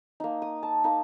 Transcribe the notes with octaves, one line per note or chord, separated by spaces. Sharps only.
A#3 D#4
D#6
A5
A#3 D#4